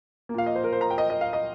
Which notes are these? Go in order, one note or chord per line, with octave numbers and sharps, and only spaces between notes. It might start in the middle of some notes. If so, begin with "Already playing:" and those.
A#3
A#2 F5
D#5
C5
A#4
C5
A#5
G5
D#5
D#5
F5
D#5